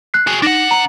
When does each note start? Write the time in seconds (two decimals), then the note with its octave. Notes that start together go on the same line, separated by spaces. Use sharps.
0.14 F#6 C7
0.27 F#4 G#4
0.42 D4 D#4 F#5 A#6 E7
0.71 A#5